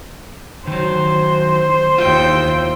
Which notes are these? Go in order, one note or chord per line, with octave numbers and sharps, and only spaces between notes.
D#3 F#3 C5
D#2 E4 F4 G5